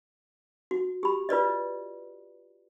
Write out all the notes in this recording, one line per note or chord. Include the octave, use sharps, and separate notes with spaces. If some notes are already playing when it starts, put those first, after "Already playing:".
F#4
G4 B5
F4 B4 D5 D#5